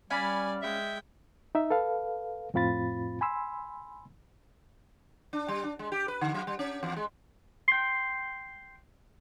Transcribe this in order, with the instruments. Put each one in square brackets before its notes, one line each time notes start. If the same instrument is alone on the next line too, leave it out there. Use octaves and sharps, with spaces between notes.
[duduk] G3 [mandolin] C#4 F5 B5 [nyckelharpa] D5 [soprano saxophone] G#5
[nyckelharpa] G#3 G5 [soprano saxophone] E5
[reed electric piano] D#4 E5
A4 B4 F5
F2 A2 C4 F4 B5 A6
G#5 B5 C6 E6
[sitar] D4
G3
D4
G#3
G4
B4
D3
F#3
G3
C#4
E2
G#3
[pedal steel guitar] G5 C6